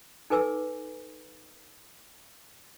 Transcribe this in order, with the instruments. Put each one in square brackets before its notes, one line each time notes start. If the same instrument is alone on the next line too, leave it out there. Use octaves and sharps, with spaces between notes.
[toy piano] D#4 A4 B4 G#5 D6 E6